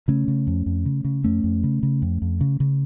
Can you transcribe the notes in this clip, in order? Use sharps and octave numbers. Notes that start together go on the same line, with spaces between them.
C#3 A3 C#4
C#3
F2
F2
C#3
C#3
F2 A3 C#4
F2
C#3
C#3
F2
F2
C#3
C#3